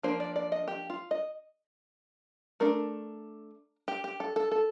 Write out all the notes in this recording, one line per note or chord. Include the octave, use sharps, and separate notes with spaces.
F3 A#3 D4 C5
D5
D5
D#5
G4
F4
D#5
A3 D4 A#4
G4
G4
A4
A4
A4